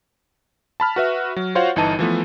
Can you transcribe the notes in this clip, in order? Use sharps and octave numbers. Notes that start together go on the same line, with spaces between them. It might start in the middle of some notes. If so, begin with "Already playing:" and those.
A5 B5 F6
F#4 B4 E5
F#3
F4 F#4 C5 C#5 F5 F#5
G1 E3 D#4 A5 D#7
E3 F3 A3 B3